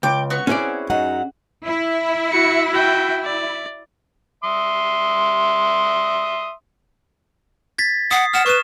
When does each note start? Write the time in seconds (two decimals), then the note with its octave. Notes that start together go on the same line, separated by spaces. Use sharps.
0.03 C#2 G5 D6
0.30 B3 F#4 C#6
0.47 C4 C#4 E4 G#4 D5
0.90 F#2 F#3 D#4 F#5
1.66 E4
2.32 F#4 C#7
2.72 F#4 G5
3.24 D5
4.44 E5 C6 D#6
7.78 G#6 A6 B6
8.11 F#5 D#6 C7
8.33 F#5 F6 E7
8.46 B4 C#6 E7